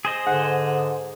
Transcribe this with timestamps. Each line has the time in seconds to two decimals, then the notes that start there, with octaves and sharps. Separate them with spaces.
0.05 G#4 C5 D#5
0.27 G#2 D3 F#5